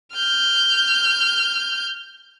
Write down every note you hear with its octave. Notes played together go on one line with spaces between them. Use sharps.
F6 G6